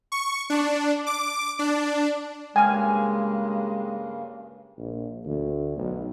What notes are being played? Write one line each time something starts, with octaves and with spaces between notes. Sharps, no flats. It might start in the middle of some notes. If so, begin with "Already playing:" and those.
C#6
D4
D6
D4
G2 C#3 G#3 A#3 G5 G#5 F6
A#1
D2
B1